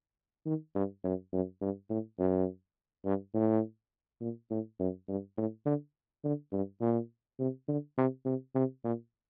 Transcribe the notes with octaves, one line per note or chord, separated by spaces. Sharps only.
D#3
G2
F#2
F#2
G2
A2
F#2
G2
A2
A#2
A2
F#2
G2
A2
D3
D3
G2
A#2
C3
D3
C3
C3
C3
A#2